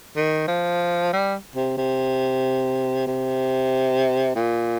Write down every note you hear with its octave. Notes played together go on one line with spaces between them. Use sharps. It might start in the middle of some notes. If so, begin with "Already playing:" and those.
D#3
F3
G3
C3
C3
C3
A#2